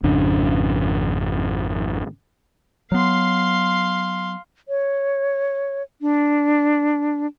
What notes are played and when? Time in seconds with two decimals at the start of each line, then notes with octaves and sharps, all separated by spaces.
0.03 G#1 F2 C#3 D4
2.92 F#3 B3 F5 C6
4.68 C#5
6.02 D4